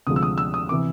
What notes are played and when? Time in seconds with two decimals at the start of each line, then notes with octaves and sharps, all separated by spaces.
0.07 D2 C3 F3 G#3 D#6
0.16 E6
0.23 D#6
0.38 E6
0.54 D#6
0.69 C3 E3 D6